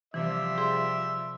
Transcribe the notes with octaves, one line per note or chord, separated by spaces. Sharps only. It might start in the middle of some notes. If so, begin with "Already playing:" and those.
C3 E3 F3 G3 E5
G#4 C6